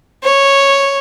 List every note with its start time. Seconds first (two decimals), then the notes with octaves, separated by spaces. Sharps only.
0.23 C#5